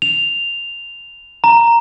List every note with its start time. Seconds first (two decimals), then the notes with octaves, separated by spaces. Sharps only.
0.02 F7
1.44 A#5